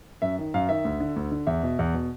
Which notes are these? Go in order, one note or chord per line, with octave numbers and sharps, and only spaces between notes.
F#2 E5
D#3
F#2 F5
D#3 E5
D2
D3
D2
D3
E2 E5
B2
E2
B2